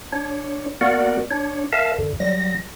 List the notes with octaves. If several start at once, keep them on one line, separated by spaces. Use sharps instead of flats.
D4 C#5
A#3 B3 F#4 A#4 D5 F#5
D4 C#5
A#4 E5 F5 A5
F#2 D3
F#3 G3 A#6